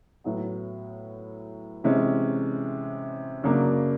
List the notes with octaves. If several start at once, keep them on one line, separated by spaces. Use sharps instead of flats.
A2 F#3 B3
C3 E3 G#3 C#4
F#2 C#3 F#3 A#3 D4